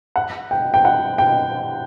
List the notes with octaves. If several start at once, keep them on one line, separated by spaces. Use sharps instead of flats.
F#5
G5
G5
F#5
G5